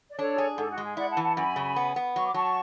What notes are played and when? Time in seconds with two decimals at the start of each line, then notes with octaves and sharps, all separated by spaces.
0.10 D5
0.18 D4 A4 C#5
0.38 G#4
0.57 G#2 A4
0.70 F#4
0.78 G#3
0.84 G#4
0.97 E4 D5 F#5
1.10 F#5 A5
1.17 E3
1.23 F#5 A5
1.36 F#2 G#5 B5
1.56 C#3
1.76 B3
1.96 B3
2.16 F#3 C#6
2.25 D6
2.34 F#3 A5 C#6